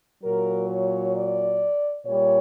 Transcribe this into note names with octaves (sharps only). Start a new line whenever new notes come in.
A#2 F#3 A#4
C#5
D5
A#2 G3 C#5